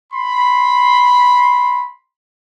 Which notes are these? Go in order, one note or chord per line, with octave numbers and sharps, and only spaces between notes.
B5 C6